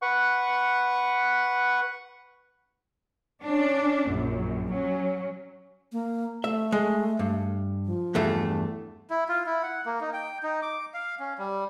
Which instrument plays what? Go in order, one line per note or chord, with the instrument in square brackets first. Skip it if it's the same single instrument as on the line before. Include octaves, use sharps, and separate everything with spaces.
[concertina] B4 F#5 C#6
[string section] C#4 D4
A#1 F#2
F#3 C#4
[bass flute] A#3
[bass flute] A3 [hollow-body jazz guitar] E5
[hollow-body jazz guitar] G#3
G2
[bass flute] F3
[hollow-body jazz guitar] E2 G2 A3
[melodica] E4
F4
E4
F#5
A#3
D#4
G5
D#4
D6
F5
C#4
G3